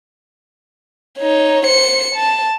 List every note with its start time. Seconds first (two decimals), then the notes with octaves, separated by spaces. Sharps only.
1.19 D#4 C#5
1.65 C5 C#7
2.15 A5